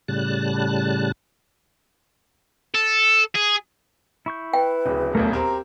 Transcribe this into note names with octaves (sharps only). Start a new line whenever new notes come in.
A2 C#3 G3 A5 F#6
A4
G#4
E4 C#6 G6
B4 G5
D1 C#3
D#1 B1 E2 A3 A#4
C4 G4 A#4 A#5